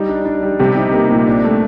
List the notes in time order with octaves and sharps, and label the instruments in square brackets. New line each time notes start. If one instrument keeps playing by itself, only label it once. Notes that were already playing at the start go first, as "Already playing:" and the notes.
Already playing: [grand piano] G3 D#4
D4
D4
G3
[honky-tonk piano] C3 [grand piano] G3
[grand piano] D#4
A#3
A#2
D4
A3